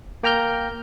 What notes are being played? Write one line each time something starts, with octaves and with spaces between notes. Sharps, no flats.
A#3 G5 A#5 F6 G6